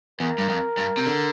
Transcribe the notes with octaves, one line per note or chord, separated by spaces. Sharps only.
E2 A#4
G2
F2
G2
C3
D3